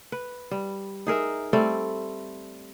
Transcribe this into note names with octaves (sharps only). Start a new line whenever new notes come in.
B4
G3
D#4 G#4 A#4 E5
G3 A3 C4 D5